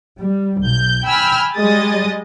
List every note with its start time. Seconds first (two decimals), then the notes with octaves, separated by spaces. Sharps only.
0.20 G3
0.62 B1 G6
1.05 G5 G#5 B5 E6 F6
1.55 G3 G#3 D#5 D#6 A6